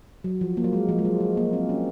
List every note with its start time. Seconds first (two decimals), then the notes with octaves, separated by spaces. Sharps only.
0.24 F#3
0.41 F3
0.57 A#3
0.64 F#3
0.73 G#3
0.89 F3
0.99 G#3
1.05 F#3
1.20 G#3
1.37 A#3
1.53 C4
1.69 C#4